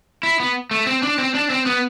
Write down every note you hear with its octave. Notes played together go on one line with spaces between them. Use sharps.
E4
B3
A3
C4
D4
C4
D4
C4
B3